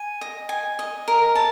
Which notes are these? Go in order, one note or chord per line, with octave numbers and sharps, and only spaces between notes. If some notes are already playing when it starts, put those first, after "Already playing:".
Already playing: G#5
D#5
G#5
D#5
A#4
A5